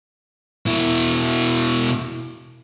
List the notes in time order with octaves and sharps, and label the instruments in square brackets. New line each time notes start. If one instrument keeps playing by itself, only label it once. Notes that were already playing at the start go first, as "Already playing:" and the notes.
[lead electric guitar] B2 E4